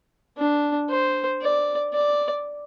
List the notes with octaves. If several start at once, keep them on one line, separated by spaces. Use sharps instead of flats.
D4
C5
D5
D5